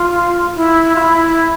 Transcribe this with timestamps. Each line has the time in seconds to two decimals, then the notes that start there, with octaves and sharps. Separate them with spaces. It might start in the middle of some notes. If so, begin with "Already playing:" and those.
Already playing: F4
0.55 E4
0.96 F4
1.00 E4